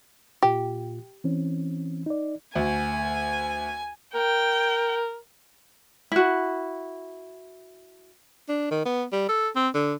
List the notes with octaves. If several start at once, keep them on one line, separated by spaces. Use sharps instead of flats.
A#2 F4 G4
E3 C4 C#4
D#4 D5
D2 G#5
A#4 G5
E4 F#4
D4
D#3
B3
G3
A4
C4
D3